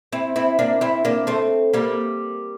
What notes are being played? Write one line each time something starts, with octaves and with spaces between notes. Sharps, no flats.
C4 E4
C4 E4
A#3 D4
C4 E4
A#3 D4
A3 C4
G3 A#3